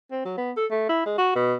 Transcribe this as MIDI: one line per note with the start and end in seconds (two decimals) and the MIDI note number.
0.11 0.22 60
0.25 0.34 54
0.38 0.51 59
0.57 0.66 69
0.71 0.87 57
0.89 1.04 64
1.06 1.17 56
1.18 1.33 66
1.36 1.54 47